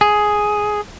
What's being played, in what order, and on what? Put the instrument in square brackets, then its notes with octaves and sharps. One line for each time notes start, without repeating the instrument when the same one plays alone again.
[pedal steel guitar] G#4